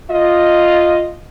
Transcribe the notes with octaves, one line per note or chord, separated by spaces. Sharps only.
F4 D#5